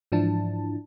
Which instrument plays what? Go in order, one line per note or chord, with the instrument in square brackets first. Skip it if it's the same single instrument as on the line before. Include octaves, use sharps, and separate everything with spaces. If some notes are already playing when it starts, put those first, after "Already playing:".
[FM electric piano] G#2 E3 F3 D4 E4 A5